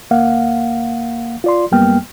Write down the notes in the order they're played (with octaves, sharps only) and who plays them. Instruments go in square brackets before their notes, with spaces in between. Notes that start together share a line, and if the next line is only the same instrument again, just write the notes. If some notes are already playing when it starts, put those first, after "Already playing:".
[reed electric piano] D2 A#3 F5 F#5
F4 D5 C6
F#2 G3 A#3 B3 G5 F6